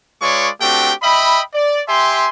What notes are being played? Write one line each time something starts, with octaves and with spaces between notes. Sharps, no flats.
G#3 F4 B4 C#5 D5 C#6
A3 C4 D4 F#4 G4 G5
D#5 E5 G5 B5
D5
G4 E5 G#5 C6